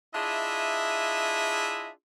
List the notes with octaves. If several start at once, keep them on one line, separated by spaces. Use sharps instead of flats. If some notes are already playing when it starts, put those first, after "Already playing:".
D4 E4 F4 G#4 D#5 E5